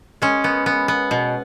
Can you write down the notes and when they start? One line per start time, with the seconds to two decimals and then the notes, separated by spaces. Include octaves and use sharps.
0.22 G#3 C#4
0.44 B3
0.66 B3
0.88 B3
1.11 B2